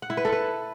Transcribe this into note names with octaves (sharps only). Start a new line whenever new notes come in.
F#5
E4
B4
A4
B4